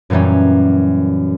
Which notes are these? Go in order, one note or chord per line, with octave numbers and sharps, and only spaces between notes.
F#2 A#2 E3 G3 C#4